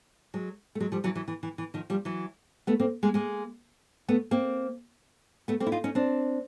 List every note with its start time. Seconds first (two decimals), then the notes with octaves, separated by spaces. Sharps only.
0.34 F#3 G#3
0.75 A3
0.80 F#3 G#3
0.92 F3 G3
1.04 E3 F#3
1.15 E3 F#3
1.28 E3
1.43 E3
1.58 E3
1.74 D#3 F3
1.90 F3 G3
2.05 E3 F#3
2.67 A3 B3
2.80 A#3 C4
3.03 G#3 A#3
3.14 G#3 A#3
4.08 A3 B3
4.31 A#3 C4
5.48 A3 B3
5.60 A#3 C4
5.66 E4
5.72 D#4 F4
5.84 C#4 D#4
5.95 C4 D4